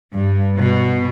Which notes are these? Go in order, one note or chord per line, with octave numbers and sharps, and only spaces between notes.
G2
B2